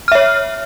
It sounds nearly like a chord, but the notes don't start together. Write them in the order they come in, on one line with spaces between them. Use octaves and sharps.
F6 E5 C#5